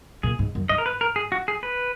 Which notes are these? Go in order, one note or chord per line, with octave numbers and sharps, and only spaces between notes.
A#2 G#4
G#2
F#2
G#2 D#5
A#4
B4
A#4
G#4
F#4
G#4
B4